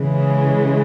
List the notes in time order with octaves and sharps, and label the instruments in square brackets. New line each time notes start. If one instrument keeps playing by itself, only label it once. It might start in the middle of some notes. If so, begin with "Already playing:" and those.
Already playing: [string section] C#3 E3 G#3